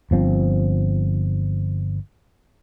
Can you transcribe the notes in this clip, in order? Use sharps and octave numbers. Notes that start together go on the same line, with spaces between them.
G1 F3 C4